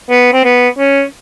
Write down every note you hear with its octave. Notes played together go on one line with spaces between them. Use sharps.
B3
C4
B3
C#4